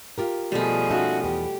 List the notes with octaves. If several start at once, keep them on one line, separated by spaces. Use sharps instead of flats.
F4 G4 A#4
B2 F3 G3 A3 G#4
C#4 D#4 F#4 E5
E2 B3 G4